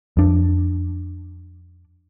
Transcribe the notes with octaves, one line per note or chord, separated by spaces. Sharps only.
F2 D4